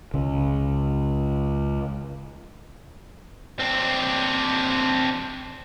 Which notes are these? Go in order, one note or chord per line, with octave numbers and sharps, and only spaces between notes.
C#2 C#3
C4 D4